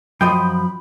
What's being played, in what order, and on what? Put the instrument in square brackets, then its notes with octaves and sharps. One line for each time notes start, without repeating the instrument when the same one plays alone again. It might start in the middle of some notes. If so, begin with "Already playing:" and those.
[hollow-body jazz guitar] F#2 F3 D#5 [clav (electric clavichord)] G5 [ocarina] B5